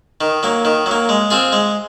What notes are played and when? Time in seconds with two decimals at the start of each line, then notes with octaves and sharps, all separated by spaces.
0.21 D#3
0.43 F#3 A#3
0.65 D#3
0.86 F#3
0.91 A#3
1.09 G#3
1.30 C4 F4 G#4
1.53 G#3